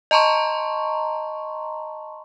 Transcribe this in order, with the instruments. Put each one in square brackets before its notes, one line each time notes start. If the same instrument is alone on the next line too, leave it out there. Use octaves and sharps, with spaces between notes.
[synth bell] D#5 A5 A#5 C6 C#6